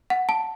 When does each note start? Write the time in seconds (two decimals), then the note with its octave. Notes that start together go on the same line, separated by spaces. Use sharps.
0.10 F#5
0.29 A5